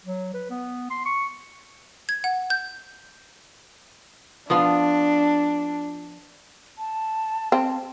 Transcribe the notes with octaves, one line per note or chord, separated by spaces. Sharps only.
F#3
B4
B3
C6
C#6
G#6
F#5
G6
F3 B3 D4 F4
A5
C4